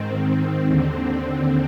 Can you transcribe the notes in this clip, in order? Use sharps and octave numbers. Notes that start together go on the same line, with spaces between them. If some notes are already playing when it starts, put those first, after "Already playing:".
Already playing: G#2 D#3 C4
D#2 D3